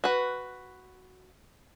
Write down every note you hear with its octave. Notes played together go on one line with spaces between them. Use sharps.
F#4 B4